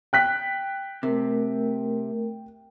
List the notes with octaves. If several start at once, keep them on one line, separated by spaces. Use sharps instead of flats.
G5 F#6 B6
C3 A3 A#4